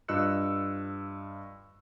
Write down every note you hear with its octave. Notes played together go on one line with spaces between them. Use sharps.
G2 F4 D#5 E6 F#6 C#7